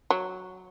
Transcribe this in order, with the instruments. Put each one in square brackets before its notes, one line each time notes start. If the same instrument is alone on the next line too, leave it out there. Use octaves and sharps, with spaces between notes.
[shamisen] F#3